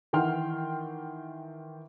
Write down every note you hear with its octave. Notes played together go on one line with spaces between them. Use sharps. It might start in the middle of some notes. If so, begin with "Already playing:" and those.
D#3 E3 F#5 G5 C6 F6